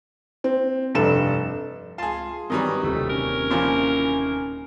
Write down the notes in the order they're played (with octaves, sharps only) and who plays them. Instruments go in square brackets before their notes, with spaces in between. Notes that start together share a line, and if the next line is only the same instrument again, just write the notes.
[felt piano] C4
F1 G2 A4 E7
[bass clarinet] C#2 [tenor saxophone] F4 [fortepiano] G#4 A5
[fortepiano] D#3 F#3 G3 [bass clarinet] E3 [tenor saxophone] D#5
[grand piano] D#1 C3 [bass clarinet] C#2 [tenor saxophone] A3
[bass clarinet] C#4 [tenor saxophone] A#4
[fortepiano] A#2 E3 F3